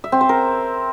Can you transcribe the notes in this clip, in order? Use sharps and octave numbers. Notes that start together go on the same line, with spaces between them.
E5
C4
C5
A#4